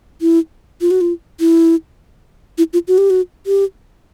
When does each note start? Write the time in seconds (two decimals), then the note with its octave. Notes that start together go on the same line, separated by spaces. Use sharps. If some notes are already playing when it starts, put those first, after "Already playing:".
0.21 E4
0.81 F4
0.91 F#4
1.01 F4
1.40 E4
2.58 E4
2.73 F4
2.88 F#4
2.98 G4
3.10 F#4
3.47 G4